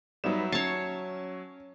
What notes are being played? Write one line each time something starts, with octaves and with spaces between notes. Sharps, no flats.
F#3 G3 B3 D#4 E5 E7
C#4 C#5 A5 C7